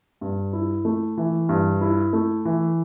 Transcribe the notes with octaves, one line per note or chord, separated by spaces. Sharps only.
G2
E4
A3
E3
G2
E4
A3
E3